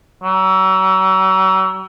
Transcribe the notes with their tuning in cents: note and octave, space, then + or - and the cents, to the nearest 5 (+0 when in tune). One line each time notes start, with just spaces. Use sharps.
F#3 +40